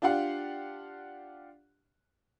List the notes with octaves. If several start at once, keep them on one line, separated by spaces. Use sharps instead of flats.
D4 F4 G4 F5 F#5